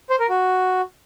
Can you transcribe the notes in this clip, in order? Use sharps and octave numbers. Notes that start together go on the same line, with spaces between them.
C5
A#4
F#4